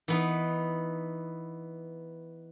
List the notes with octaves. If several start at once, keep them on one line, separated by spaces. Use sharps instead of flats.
E3 B3 D#4